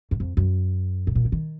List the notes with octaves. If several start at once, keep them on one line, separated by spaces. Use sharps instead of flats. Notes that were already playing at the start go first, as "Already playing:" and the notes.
F#2
F2
F#2
A2
A#2
C#3
D#3